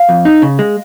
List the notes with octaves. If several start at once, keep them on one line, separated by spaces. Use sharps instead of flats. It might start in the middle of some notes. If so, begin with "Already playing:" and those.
Already playing: F5
F2
D#4
C#3
G#3